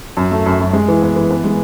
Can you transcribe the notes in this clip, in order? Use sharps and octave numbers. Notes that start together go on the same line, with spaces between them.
F#2
A3
F#2
F#2
G#3
E3
B3
E3
B3
G#3